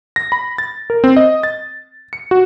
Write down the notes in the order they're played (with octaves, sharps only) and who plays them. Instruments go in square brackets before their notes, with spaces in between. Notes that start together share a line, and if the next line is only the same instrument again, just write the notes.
[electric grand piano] A#6
B5
A6
A#4
C4
D#5
A6
C#7
F#4